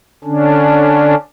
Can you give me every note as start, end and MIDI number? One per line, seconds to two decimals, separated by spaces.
0.24 1.15 50
0.24 1.15 61
0.24 1.15 62